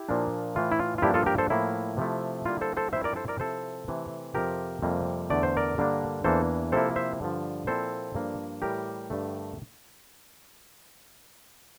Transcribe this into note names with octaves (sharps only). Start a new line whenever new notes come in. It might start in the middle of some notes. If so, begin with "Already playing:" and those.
Already playing: E4 G4
A#2 F3 A#3 D4
A2 E3 A3 F4
E4
F4
F4
G2 F3 A#3 D4 E4 G4
F4 A4
G4 A#4
A4 C5
A2 F3 A#3 E4
C3 F3 A3 E4
D3 G3 A#3 E4 F4
A4 C5
A4 C5
G2 F3 C4 E4 C5 E5
A#4 D5
A4 C5
A#4 D5
C3 F3 C4 E4 A4 C5
C3 E3 A3
F2 C3 F3 G4 A#4
F2 C3 G3 A#3
E2 D3 A3 D5
C5
A#4 D5
G2 D3 G3 A#3 D4
E2 E3 A#3 D4 A4 C5
C3 F3 A#3 E4 A4 C5
C5 E5
G2 D3 F3
A#2 F3 C4 E4 A4 C5
G2 F3 A#3 D4
A2 E3 G3 G4 A#4
G2 D3 A3